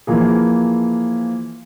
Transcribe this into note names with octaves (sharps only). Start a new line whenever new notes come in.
E3 F3 A#3 G#4